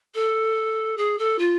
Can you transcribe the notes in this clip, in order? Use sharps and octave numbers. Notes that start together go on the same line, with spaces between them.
A4
G#4
A4
F4